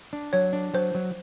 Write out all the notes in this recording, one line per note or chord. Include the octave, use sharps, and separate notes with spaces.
D4
F#3 C#5
D4
F#3 C5
F#3